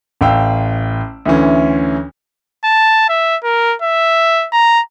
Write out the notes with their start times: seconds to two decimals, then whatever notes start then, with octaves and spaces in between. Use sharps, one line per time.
0.21 A1 F5 G5 E6
1.25 D2 D3 E3 C#4
2.64 A5
3.09 E5
3.44 A#4
3.82 E5
4.53 A#5